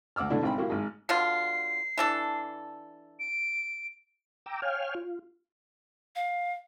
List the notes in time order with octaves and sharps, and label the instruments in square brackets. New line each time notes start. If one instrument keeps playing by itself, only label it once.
[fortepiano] D2 F#5 D6 E6 F6
B2 D3 A3 D4 E4
G#1 G#2 C4 G5 B5
A#3 E4 F#4 G4
G#1 G#3
[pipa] B2 D3 F4 [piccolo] C7
[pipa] E3 D4 A4
[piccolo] D7
[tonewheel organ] G5 A#5 D6 E6
C#5 F5 G5 G#5 F6
F4
[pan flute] F5